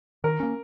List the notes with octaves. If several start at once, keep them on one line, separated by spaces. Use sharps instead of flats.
D#3 A#4
A#3 C#4